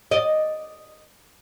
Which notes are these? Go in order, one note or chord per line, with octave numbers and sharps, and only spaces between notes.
D5 D#5